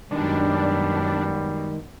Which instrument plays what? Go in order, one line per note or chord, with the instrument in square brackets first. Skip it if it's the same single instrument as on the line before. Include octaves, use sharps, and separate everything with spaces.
[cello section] F#2 B2 [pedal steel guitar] D#3 G#3 [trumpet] G3 [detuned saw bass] D4